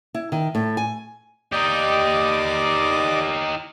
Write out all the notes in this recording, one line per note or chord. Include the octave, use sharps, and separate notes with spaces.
E4
D#3
A2
G#5
D#4 G4 D5 D#5 D6